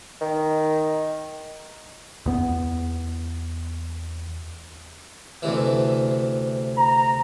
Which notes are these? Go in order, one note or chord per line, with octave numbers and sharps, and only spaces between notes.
D#3
E2 B3
D2 C3 E3
A#5